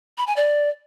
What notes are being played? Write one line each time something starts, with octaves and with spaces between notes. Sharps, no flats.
B5
G#5
D5